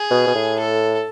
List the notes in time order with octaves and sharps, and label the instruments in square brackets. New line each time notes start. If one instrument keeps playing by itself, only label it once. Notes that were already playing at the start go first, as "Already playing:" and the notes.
Already playing: [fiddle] G#4
[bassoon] B2
B2
A2
[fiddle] A4